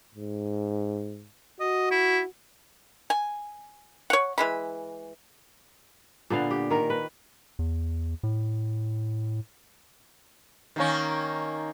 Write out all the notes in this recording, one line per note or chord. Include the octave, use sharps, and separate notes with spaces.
G#2
F#4 D#5
E4
G#5
C#5 F#5
E3 G#3 B5
A#2 D3 B3 F5
G4
D#3 A#4
B4
E2
A2
D#3 A#3 C#4